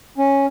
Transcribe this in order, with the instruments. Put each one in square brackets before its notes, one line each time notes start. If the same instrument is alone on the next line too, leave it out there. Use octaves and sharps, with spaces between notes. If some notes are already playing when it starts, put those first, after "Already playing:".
[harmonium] C#4